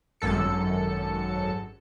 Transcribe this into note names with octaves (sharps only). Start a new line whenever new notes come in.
G#1 F#2 A4 C#7